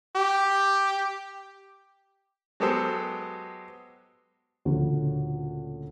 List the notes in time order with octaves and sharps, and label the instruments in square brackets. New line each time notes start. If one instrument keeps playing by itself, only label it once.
[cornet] G4
[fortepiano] F#3 G#3 B3 G4 A4 C5
[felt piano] D2 A#2 C#3 F3